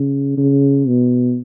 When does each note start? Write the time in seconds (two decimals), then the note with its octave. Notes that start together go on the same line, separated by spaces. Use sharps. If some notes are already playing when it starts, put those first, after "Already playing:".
Already playing: C#3
0.37 C#3
0.87 B2